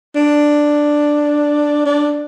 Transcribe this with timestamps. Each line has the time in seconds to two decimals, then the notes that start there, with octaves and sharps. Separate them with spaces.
0.15 D4
1.86 D4